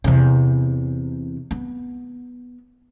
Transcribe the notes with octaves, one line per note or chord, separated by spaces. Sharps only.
E2 C3
B3